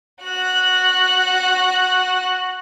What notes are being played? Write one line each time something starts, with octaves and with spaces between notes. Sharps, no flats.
F#4 F#6